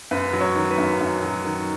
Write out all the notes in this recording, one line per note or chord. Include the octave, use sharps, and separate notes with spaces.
F#2 B4
F#3
C#5
D#3
B4
F#2
F#2
F#3
D#3